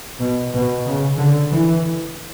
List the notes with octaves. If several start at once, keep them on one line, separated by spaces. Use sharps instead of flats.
B2
B2
C#3
D3
E3